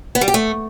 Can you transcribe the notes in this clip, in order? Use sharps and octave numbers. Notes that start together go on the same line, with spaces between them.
B3
G3
G4
A3